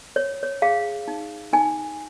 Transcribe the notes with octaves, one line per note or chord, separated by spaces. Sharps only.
C#5
C#5
G#4 F5
D#4
D#4 G#5